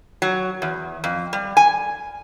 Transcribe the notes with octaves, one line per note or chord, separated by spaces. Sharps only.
F#3
E2
F2
G3
G#5